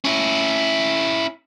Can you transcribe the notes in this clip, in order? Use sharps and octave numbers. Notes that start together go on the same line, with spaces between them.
C#4 E4